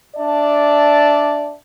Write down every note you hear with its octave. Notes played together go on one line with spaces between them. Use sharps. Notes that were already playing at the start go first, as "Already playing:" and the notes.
D4 D5 E5 A5